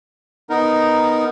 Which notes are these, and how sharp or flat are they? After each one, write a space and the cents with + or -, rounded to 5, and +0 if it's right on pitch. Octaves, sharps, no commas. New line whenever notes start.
B3 +0 D#4 +0 A#4 +0